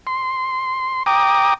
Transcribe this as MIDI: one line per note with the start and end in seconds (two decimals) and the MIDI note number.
0.07 1.03 84
1.06 1.54 79
1.06 1.54 82
1.06 1.54 86
1.06 1.54 87